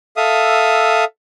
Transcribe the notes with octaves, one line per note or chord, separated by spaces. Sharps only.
A4 E5 F5 D#6